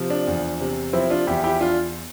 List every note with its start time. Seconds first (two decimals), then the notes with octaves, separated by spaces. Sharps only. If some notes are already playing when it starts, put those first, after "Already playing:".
Already playing: C3 F3
0.10 D4
0.27 E2
0.60 C3
0.93 F3 C4 E4
1.10 D4 F4
1.27 E2 E4 G4
1.44 E4 G4
1.61 D4 F4